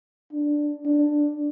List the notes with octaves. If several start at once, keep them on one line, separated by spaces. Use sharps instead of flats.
D4
D4